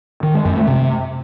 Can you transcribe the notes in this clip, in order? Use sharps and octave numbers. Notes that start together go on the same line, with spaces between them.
D#3
G#3
F#2
A3
C3